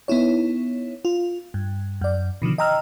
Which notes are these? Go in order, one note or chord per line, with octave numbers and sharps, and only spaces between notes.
B3 D#4 E4 C#5
F4
G2
F#2 D5
B2 D3 D#3 F3
D#5 G5 A#5 E6 F6